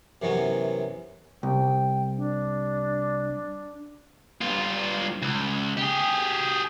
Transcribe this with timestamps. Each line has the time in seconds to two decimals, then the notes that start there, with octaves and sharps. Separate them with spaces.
0.22 F#2 C3 E3 F#3 B3 C#4
1.43 C2 G5
2.17 D4
4.42 G2 F4
5.22 C#2
5.77 G4 G#4